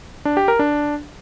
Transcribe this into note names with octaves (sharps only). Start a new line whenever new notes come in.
D4
G4
A#4
D4